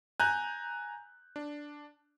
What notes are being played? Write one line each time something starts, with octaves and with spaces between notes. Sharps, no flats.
G#5 A#5 F#6 G6
D4